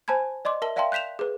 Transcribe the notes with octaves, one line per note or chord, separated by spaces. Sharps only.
C5 G#5 A5 B5 G#6
D5 D#5 C6 D6
A#4 E5 A5 G7
D5 E5 F5 G5 A5 C6
F#6 G6 B6 E7 F7
G#4 B4